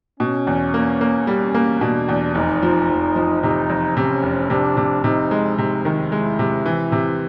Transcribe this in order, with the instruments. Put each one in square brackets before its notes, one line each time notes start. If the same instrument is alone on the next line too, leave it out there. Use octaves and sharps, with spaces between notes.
[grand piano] B2 [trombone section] C#4
[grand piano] E2
A#3
A#3
[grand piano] G3 [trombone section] C#4
[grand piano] A#3
[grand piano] B2 [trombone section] D4
[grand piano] E2
[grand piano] F1 [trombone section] D#4
[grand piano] F3
F1
F3
[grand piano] C3 [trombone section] D#4
[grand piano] F2
[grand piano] C3 [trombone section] C#4
[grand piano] F1
[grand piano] C3 [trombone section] D4
[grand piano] C3
[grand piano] C3 [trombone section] D#4
[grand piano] G#3
[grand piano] C3 [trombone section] D#4
[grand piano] D#3
[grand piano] G#3 [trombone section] E4
[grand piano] C3
E3
C3